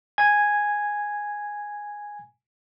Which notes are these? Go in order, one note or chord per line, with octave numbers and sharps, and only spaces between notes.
G#5 G#6